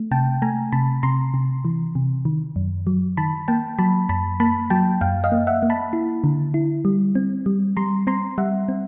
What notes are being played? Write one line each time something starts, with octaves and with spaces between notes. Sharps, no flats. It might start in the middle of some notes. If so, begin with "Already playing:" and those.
Already playing: A3
C3 G5 A5
A3 G#5 A#5
C3 A5 B5
C3 A#5 C6
C3
E3
C3
D#3
F#2
F#3
D#3 A5 B5
A#3 G5 A5
F#3 A5 B5
F#2 A5 B5
A#3 A5 B5
F#3 G5 A5
F#2 F5 G5
D#5 F5
A#3
E5 F#5
A#3
A5 B5
E4
D3
E4
G3
C4
G3
G3 A#5 C6
C4 A#5 C6
G3 E5 F#5
C4